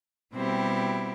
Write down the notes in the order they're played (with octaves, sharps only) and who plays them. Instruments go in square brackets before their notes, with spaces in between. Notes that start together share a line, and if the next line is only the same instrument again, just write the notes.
[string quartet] B2 G3 C4 E4 G4